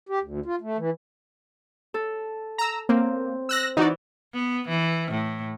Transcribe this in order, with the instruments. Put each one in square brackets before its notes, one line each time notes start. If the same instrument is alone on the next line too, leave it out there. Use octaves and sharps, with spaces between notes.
[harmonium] G4
D2
F4
A3
E3
[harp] A4
[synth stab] A#5 E6
[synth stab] A#3 [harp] C4
[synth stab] E6 F#6 A#6
[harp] E3 [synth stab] D#4 F#4 D5
[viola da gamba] B3
E3
A2